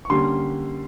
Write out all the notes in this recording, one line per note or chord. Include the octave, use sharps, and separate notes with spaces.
C#6
D3 G3 A#3 C#4 C6